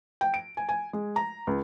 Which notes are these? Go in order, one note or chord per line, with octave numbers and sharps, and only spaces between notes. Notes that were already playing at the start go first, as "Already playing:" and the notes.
G5
D7
G#5
G#5
G#3
A#5
C#2